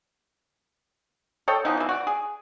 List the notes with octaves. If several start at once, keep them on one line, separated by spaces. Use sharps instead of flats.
A4 C#5 D#5 G5
E3 F3 B3 D#4
B2 E3
F#4 D5
G#4